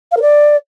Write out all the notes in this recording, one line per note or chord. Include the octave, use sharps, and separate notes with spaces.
F5
A#4
D5